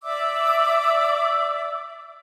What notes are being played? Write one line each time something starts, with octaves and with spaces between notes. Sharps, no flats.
D5 E5 D6 E6